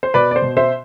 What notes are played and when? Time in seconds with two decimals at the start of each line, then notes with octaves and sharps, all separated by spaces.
0.03 C5
0.14 B2 B4 D5
0.31 D5
0.36 C5
0.42 B2
0.57 C5 E5